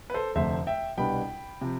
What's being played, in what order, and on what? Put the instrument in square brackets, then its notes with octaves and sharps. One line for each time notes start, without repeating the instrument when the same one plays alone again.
[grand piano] B4
A4 C5
F1 F2 D3 A3 C5 E5
E5 G5
C2 B2 G3 B3 D4 G5 B5
C3 F3